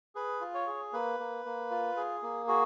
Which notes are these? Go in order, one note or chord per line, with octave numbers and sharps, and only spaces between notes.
G#4 B4
F4
C#5
G#4
A#3 B4
A#3
A#3
F4
G#4
A#3
F#4 G#4